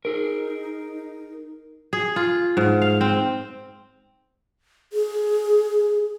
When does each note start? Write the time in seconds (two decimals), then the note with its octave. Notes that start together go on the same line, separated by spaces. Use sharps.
0.05 D#4 G#4 A#4
1.93 G#4
2.16 F4
2.57 G#2
2.82 F5
3.01 C4
4.93 G#4